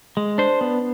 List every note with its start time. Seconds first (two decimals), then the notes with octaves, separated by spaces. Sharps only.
0.17 G#3
0.38 D4 C5
0.61 B3